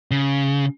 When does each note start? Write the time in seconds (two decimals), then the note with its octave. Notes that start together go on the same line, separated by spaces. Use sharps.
0.11 C#3